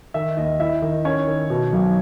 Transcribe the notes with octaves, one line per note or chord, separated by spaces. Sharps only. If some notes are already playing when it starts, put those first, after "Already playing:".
D#3 E5
D#2 D#5
E4 E5
D#3 D#5
C#4 C#5
D#3
B2
B1